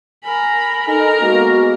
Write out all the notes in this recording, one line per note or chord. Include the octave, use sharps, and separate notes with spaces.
A#4 G#5 B5
D#4 A4 A#4
G#3 A#3 B3 F#4